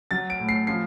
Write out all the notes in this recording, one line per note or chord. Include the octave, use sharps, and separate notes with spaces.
F#3 A6
D7
A2
C7
F3 C7